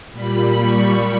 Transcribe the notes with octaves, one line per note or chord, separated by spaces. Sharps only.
A#2 G3 B5
C#6